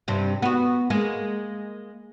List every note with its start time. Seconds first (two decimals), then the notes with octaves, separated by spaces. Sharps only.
0.08 G2 C3
0.42 B3 F#4
0.90 G#3 A#3